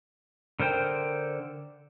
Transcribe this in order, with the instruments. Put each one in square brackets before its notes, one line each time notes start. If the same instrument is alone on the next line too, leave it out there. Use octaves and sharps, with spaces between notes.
[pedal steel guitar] D3 A#4 C5 G5